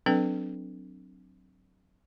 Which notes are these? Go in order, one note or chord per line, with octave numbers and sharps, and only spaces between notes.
F#3 C4 D4 A4 B4 G5